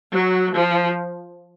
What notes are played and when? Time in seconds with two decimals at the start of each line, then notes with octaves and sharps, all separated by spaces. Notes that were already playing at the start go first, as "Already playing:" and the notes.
0.13 F#3
0.53 F3